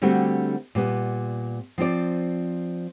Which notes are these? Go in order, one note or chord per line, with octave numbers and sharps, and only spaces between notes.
D3 G3 A3 C4 D4 F#4
A#2 G3 B3
F3 C4 F4 D5